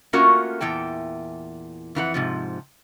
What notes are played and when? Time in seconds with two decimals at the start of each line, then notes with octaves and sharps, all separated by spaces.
0.13 A3 A#3 C#4 F4 F#4 A#4
0.61 E2 A#2 E3 G5 A5
1.95 F2 E3 F4 F#5
2.14 G#2 C3 F3